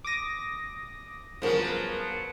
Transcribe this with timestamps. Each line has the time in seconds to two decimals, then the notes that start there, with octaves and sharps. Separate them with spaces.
0.04 D6 D#6 A#6
1.42 C#3 F3 F#3 B3 A#4